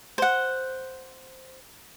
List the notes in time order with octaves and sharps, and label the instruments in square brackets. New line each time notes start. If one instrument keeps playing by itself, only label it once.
[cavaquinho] C5 F#5